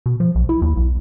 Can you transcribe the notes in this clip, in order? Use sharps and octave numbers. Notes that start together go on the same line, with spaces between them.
B2
F3
B1
E4
D#2
B1